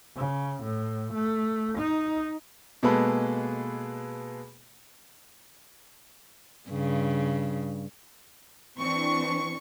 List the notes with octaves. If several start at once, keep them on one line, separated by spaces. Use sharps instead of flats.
C#3
A2
A3
D#4
B2 G#3 A#3 G#4 A4 B4
G2 C#3
E3 C4 D4 C#6